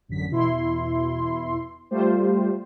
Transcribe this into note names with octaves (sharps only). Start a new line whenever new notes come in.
A1 F#2 D3 B6
E2 B2 E4 C6
G3 A3 F4 G4 C5